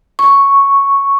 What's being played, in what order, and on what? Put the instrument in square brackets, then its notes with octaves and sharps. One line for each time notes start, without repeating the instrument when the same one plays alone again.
[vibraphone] C#6